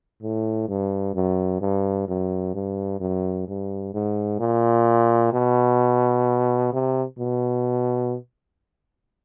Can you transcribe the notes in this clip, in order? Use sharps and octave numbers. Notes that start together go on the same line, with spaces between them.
A2
G2
F#2
G2
F#2
G2
F#2
G2
G#2
A#2
B2
C3
B2